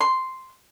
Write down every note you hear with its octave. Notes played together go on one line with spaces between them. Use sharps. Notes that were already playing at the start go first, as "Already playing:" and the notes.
C6